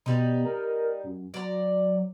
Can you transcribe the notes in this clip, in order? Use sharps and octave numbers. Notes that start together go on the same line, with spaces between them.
B2 G3 D#4
A#4
F#2
F#3 D5 A#5